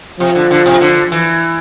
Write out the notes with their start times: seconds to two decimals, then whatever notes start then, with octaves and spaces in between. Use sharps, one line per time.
0.20 C3 F3
0.35 D3
0.51 D3
0.66 C3
0.81 D3
1.12 E3